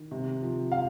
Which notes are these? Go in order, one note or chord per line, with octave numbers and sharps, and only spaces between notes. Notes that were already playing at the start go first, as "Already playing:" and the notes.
Already playing: D#3
C3
F3
F3 F5